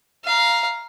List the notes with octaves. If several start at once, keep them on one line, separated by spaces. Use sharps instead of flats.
F5 A#5